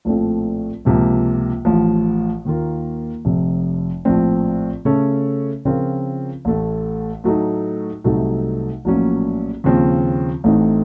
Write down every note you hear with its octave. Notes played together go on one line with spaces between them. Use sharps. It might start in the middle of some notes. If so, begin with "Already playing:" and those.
A#1 A2 F3 A3 C4
C#2 C3 F3 A#3
A1 A2 F3
D#2 D#3 A#3 F4 A#4
F1 F2 C3
A#1 A2 F3 C4
C#3 A3 C#4 A4 C#5
C#3 F3 C4 F4 A#4
A1 A2 A3
A2 F#3 A3 D#4
C2 C3 F#3 A3 D#4
A#1 A2 F#3 A#3 C#4
D#2 C#3 F3 C4
A1 A2 A3 C4 D#4